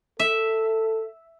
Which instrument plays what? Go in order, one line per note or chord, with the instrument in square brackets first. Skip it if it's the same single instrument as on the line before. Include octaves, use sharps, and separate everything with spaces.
[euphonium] A4 [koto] E5